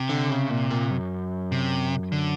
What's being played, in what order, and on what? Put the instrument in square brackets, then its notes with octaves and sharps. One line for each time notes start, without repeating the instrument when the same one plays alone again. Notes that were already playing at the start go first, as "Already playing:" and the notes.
Already playing: [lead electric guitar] C3
[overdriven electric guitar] D3
C#3
A#2
A#2
F#2
[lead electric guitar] C3
D3